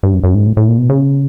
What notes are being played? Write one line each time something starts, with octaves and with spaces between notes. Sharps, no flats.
G2
F#2
F#2
G#2
A2
A2
A#2
B2
C#3